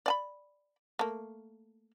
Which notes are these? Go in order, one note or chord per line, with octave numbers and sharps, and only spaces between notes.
D5 G#5 B5
A3 A#3